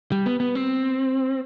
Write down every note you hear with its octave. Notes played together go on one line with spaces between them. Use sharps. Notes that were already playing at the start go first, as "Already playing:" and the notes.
G3
B3
B3
C4